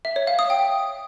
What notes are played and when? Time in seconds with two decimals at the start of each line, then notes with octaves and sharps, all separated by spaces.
0.05 E5
0.16 C#5
0.27 F5
0.39 D#6
0.50 G5